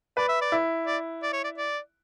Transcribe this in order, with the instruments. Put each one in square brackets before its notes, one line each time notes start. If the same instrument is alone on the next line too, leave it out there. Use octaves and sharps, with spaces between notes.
[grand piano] B4 [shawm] D5
[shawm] E5
D5
[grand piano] E4
[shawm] D5
D5
C#5
D5
D5